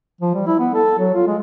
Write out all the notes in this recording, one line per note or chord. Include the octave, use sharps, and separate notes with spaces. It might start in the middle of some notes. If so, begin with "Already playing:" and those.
F3
G3
E4
B3
A4
F#3
F4
G#3